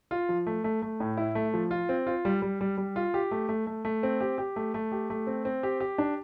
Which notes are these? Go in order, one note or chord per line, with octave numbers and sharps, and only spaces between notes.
F4
F3
A3
A3
A3
A2
E4
A3
F3
F4
C4
F4
G3
G3
G3
G3
F4
G4
A3
A3
A3
A3
C4
G4
G4
A3
A3
G4
A3
C4
C4
G4
G4
D4